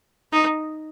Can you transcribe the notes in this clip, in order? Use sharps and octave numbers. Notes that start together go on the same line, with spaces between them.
D#4